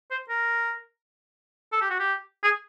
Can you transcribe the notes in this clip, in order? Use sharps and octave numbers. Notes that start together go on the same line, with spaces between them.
C5
A#4
A4
G4
F#4
G4
G#4